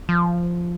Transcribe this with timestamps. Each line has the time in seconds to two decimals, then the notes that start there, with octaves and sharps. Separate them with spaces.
0.09 F3